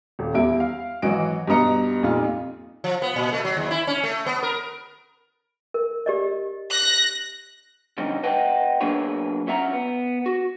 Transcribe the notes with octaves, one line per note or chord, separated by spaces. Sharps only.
D#1
E2 G3 E4 D7
F5
G#1 E3 F#3 F#4 D#5 D7
G2 B2 B3 D#5 A#5 C#7
F2 A#2 G3 D#4 F4
F3
B3
A#2
A3
F#3
D#2
E4
C#4
A3
B3
A#4
A#4
G4 D5 D#5
F#6 A#6
D3 F3 G3 C#4 D#4
B4 D#5 F#5 G5 A5
F#3 A#3 D4 G#4 B4 C#5
C#4 F4 E5 F#5 A#5
B3
F#4